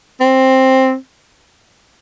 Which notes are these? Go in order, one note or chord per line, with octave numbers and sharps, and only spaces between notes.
C4